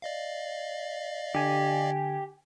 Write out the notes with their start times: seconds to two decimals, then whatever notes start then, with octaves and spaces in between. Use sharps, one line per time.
0.02 D5 D#5 F5
1.35 D3 G4 G#5